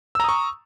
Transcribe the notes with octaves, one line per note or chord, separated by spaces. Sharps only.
A#5 C#6 D#6 E6